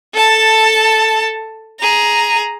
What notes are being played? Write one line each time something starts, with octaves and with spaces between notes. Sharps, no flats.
A4 A5
G#4 A#5